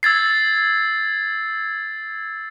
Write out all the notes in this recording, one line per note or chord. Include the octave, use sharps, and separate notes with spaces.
E6 G#6 A6 C7